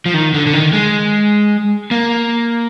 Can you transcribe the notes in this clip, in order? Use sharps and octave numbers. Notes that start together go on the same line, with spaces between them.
F3
D#3
D3
D3
D#3
G#3
A#3